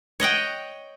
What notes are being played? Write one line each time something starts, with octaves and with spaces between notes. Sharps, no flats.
C#5 D#5 F#5 G5